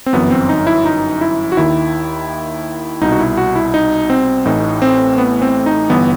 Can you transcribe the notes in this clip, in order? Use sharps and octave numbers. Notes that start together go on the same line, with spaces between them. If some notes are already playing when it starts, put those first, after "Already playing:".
C4
G1 F#2 E3 B3
C4
D#4
E4
D#4
E4
F#4
D#2 D#3 E4
C2 B2 D#4
F#4
E4
F#4
E4
D#4
C4
A1 A2 E3 D#4
C4
B3
C4
D#4
G1 G2 E3 B3